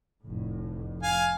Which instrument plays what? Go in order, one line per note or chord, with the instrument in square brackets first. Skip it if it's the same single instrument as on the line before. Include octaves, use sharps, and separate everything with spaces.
[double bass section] F1 A2
[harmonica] F5 G#5